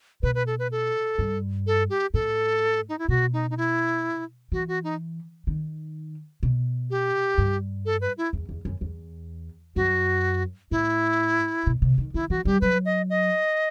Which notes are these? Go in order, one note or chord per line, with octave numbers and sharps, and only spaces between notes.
B2 B4
B4
A4
B4
A4
G2
A4
G4
A2 A4
D#4
E4
B2 F#4
D#4
D#4
E4
E3 F#4
F#4
D#4
D#3
B2
G4
G2
A4
B4
E4
E2
E2
F#2
E2
F#2 F#4
A2 E4
B2
C3
D#3
D#3 E4
E3 F#4
G3 G4
F#3 B4
D#5
D#5